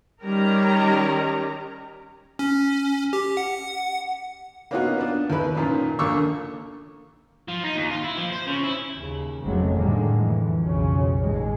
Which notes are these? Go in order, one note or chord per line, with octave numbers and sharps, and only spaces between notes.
D#3 G3 C#4 G4 A#4 A#5
C#4
G4
F#5
A#3 B3 C#4 D#4 F4 F#4
B3 D4
D#2 E4 B4
F#2 A#2 D#3
A#1 D#2 D3 A#3 C#6 E6
F3
D#4
D#2
F4
E4
F3
C5
C#3
E4
D#2 C#3
F1 C#2 C3 F#3 G#3 A3
A2 D3 D#3 G3 G#3 A#3
F2 E3
B1 F2 C#3 C#4
A1 D#2 G#3